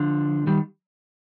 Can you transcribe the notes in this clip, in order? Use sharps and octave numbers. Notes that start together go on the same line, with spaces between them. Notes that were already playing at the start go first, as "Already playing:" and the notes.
Already playing: D3 F3
D#3 G3